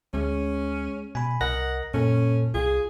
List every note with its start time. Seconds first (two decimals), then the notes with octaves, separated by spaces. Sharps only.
0.14 D2 G#3 C#4
1.15 B2 G#5 B5
1.41 C2 A#4 D#5 F#5 A#6
1.94 F#2 A#2 C#4 A4
2.54 C2 F4 G#4